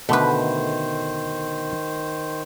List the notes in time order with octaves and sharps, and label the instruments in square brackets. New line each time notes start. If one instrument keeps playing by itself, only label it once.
[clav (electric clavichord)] B2 D3 [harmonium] D#3 C5 [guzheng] A3 B4